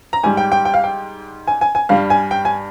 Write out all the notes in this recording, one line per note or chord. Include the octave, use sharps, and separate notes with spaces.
A#5
G#2 G3 G#5
G5
G5
G5
F5
G5
G#5
G#5
G#5
G2 G3 F5
G#5
G5
G#5